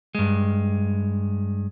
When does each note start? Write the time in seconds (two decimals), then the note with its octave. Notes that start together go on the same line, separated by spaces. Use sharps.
0.15 G2 G#3